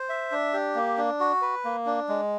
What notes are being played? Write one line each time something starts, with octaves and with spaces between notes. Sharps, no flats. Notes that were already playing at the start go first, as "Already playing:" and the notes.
Already playing: C5
E5
D4
G4
A#3
D4
F#4
B4
A#3
D4
G#3